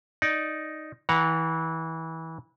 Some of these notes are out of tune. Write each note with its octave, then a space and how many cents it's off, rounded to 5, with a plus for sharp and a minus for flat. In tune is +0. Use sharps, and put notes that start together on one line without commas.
D#4 +0 D5 +0
E3 -25 F#5 +0 A#5 +0